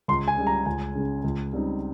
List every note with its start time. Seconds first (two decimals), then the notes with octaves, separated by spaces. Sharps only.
0.08 C#2 C6
0.28 G#5
0.38 C#3 G3
0.47 A#5
0.66 C#2 G#5
0.95 C#3 G#3 C#4
1.24 C#2
1.53 C#3 G3 C4 D#4